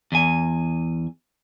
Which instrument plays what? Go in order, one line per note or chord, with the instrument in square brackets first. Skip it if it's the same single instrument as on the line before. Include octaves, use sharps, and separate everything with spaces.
[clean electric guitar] E2 G#5